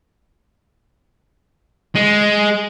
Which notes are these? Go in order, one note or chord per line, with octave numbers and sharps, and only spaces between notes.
G#3